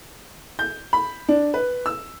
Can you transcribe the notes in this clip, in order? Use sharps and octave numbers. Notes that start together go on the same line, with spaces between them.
G6
B5
D4
B4
E6